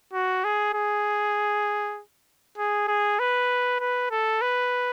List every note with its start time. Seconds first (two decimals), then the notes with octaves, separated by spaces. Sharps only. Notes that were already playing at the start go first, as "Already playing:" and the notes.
0.13 F#4
0.44 G#4
0.74 G#4
2.58 G#4
2.88 G#4
3.19 B4
3.80 B4
4.11 A4
4.42 B4